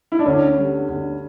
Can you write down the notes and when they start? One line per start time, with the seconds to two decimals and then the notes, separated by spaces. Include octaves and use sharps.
0.12 E4
0.19 D4
0.26 D2 C#4
0.58 D3 G3
0.89 D2